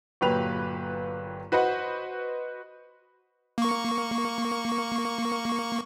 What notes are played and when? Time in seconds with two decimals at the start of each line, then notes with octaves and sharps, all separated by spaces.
0.21 G1 A#2 F#3 G4 B4 F7
1.52 F#4 B4 C5 D#5 F#5
3.58 A#3 C#6